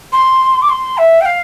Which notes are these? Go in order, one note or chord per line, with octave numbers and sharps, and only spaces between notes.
C6
D6
C6
E5
G5
F5